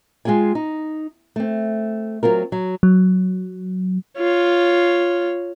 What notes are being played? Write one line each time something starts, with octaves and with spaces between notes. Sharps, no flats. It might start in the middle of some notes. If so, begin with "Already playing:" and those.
G#3 F4 G#4 G5 G#5
D#4
A3 C4
F#3 C4 F4 A#4
F#3
F#3
F4 C#5